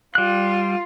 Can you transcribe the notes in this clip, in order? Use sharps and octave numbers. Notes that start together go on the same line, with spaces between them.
G3 F4 F#6